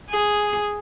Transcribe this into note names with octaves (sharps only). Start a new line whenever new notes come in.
G#4